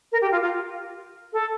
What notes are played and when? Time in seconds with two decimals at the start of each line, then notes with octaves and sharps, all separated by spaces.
0.12 A#4
0.21 G4
0.32 F4
0.42 F4
1.33 A4